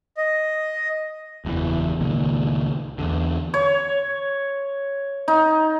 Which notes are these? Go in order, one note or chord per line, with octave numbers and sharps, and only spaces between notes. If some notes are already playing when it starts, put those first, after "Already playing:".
D#5
F#1 E2 G#2 E3
C#2 A#2 D#3
E2 D3
C#5
D#4